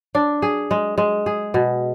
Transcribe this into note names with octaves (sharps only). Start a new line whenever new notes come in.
D4
G#4
G#3
G#3
G#4
B2